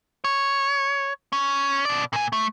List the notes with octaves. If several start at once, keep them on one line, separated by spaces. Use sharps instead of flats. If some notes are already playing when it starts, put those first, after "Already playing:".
C#5
C#4
B2 D5
A#2 G#5
A3